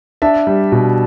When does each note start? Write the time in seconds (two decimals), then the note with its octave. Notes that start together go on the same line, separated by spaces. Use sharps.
0.22 D4 E5 A5
0.47 G3
0.72 B2